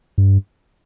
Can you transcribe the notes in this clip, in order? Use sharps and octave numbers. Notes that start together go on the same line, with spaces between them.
G2